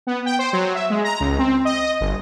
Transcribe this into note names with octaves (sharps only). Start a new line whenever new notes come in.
B3
G5
C5
F#3
E5
G#3
A#5
C#2
C4
D#5
G1